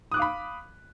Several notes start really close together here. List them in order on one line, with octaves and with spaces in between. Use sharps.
D#6 F#6 D6 F5 B5